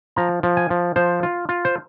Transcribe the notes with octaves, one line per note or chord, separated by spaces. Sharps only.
F3 A#5
F3
G#5
F3
F3 C5
F4
F4
C5